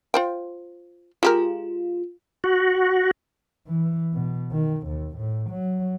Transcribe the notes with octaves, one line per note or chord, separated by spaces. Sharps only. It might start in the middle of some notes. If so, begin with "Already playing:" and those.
F4 C5 G5
G#3 F4 G4 A#4
F#4
E3
B2
D#3
D#2
A2
F#3